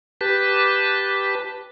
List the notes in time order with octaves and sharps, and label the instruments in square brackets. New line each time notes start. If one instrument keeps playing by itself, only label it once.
[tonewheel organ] G4 B4 A5